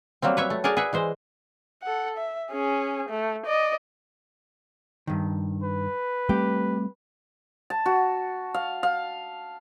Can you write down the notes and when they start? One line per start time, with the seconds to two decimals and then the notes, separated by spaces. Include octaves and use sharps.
0.22 F#3 G3 A#3 C4
0.37 B4 C#5 E5
0.50 A3
0.64 G#4 A#4 D5 F#5 G#5
0.77 G#4 B4 E5 F#5
0.93 E3 G#3 C5
1.83 A4 F#5
2.17 E5
2.52 C#4 G#4
3.09 A3
3.46 D5 D#5
5.07 G2 D#3
5.63 B4
6.29 G3 A3 C4 G4
7.70 A5
7.86 F#4
8.54 F5
8.83 F5